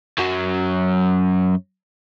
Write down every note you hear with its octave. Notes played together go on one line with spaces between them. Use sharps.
F#2 F#3